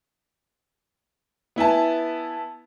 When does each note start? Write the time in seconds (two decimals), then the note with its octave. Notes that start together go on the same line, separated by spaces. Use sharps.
1.56 B3 E4 G#5 A5